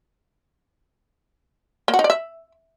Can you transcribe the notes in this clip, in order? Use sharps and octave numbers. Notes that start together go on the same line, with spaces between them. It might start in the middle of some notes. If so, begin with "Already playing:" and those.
A#3
F#4
D#4
D5
E5